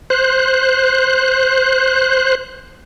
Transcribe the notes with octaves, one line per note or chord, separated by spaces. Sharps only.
C5 F#6